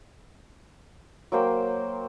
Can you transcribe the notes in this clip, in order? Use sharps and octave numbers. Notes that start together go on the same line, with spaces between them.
F#3 A#3 C5 G5